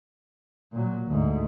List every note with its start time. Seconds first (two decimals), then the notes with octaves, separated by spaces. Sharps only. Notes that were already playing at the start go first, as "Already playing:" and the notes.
0.73 A#2 F#3
1.08 D2 G#2